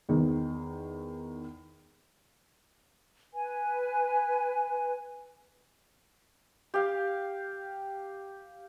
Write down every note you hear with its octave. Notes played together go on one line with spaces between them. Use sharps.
E2 D#3
B4 G#5
G4 F5